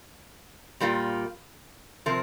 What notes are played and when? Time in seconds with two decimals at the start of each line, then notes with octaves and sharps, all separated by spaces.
0.80 A#2 G3 A#3 F4
2.06 C3 F3 C4 A#4